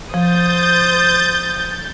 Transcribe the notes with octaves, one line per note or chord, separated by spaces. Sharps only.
F3 C5 D#6 G6 A6